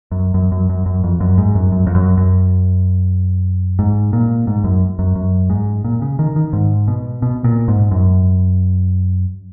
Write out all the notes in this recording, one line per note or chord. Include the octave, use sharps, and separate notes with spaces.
F#2
F#2
F#2
F#2
F#2
F2
F#2
G#2
F#2
F#2
F2
F#2
F#2
G#2
A#2
G#2
F#2
F#2
F#2
G#2
A#2
C#3
D#3
D#3
G#2
B2
B2
A#2
G#2
F#2